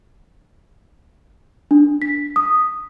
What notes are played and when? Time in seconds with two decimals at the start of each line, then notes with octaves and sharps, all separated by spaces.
1.71 D4
2.02 B6
2.36 D#6